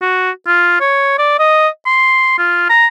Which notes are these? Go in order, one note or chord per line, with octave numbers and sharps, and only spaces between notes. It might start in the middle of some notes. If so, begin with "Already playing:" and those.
F#4
F4
C#5
D5
D#5
C6
F4
A#5